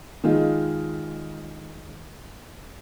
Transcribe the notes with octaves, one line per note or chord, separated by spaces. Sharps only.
D#3 G#3 F4